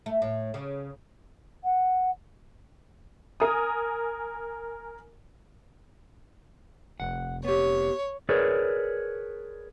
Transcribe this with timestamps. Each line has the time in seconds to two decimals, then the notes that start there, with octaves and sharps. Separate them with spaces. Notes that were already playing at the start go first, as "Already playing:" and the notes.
0.06 A3
0.22 A2
0.54 C#3
1.63 F#5
3.40 A#4 G#5 D#6
7.00 F1 F#5
7.45 B3 G4 C#5
8.29 G#4 A#4 B4 C#5 D5